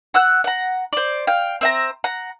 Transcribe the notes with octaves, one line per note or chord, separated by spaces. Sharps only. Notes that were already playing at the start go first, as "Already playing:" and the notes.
F#5 E6 F#6
F#5 A#5
C5 D5
F5 G5
C4 E5 A#5
F#5 A#5